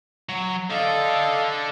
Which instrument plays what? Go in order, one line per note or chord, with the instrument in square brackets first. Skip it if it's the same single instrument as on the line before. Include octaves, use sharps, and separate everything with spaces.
[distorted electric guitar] F#3
[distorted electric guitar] D3 D5 [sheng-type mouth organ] A4 D#5 F5